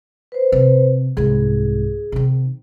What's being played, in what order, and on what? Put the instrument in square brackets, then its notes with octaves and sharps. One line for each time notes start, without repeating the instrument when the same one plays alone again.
[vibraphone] B4 C5
[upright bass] C3
[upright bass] C2 G#2 [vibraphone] G#4
[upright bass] C3 D#3